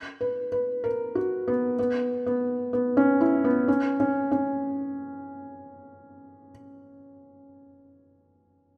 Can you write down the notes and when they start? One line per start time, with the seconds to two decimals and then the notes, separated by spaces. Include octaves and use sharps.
0.21 B4
0.52 B4
0.84 A#4
1.15 F#4
1.48 B3
1.79 B3
2.26 B3
2.73 B3
2.97 C#4
3.21 E4
3.44 B3
3.68 C#4
4.00 C#4
4.32 C#4